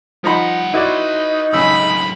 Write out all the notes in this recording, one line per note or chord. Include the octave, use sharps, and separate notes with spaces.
F3 G3 D#4 F#5 B5
D#4 E4 F#4 B4 C#5 D5
G#1 F#2 A2 C#3 B5 E6